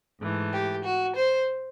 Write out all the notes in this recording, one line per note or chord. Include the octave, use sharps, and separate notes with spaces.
G#2 E3 A3
G4
F#4
C5